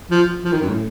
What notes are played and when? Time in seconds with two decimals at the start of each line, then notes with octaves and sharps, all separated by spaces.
0.11 F3
0.45 F3
0.53 D#3
0.62 F#2
0.69 A2